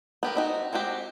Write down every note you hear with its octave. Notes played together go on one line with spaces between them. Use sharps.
B3 G4 A#4
C4 D#4 F#4
G#3 C4 F#4 G4